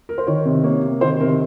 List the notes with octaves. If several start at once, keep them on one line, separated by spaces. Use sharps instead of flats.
A#4
C5
D#3 C#5
C3
A#3 C#5
C3
D#3 C5
C3 A#4